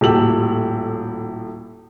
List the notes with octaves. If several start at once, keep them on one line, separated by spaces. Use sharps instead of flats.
D#1 A2 F#4 G4 E6 F#7